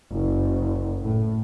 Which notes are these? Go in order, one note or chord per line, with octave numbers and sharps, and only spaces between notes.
F#1
A2